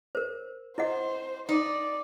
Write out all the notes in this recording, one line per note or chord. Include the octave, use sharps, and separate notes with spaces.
A#4 C5
E4 C5 D#5 F#5
D#4 D5